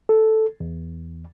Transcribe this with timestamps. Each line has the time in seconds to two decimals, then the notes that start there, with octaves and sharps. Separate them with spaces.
0.09 A4
0.60 E2